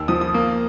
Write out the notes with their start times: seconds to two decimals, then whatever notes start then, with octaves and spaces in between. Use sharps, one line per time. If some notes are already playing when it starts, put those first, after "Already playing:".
Already playing: D#2 E6
0.08 F3 D#6
0.21 D#6
0.34 A#3